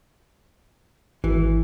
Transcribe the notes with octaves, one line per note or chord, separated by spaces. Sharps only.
G#1 E3